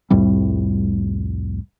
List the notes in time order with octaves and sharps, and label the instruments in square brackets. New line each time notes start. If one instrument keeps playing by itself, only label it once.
[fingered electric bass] C2 F2 A2 G3